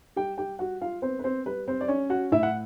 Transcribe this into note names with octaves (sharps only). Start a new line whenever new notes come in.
G3 G4 G5
G4 G5
G3 F#4 F#5
F4 F5
B3 C4 C5
B4
C4 C5
G3 B4
C4 C5
D5
C#4 C#5
F#4 F#5
A2 E4 E5
F#5